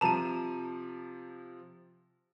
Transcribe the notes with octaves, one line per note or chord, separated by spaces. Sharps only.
C3 F3 A5 A#5 D#7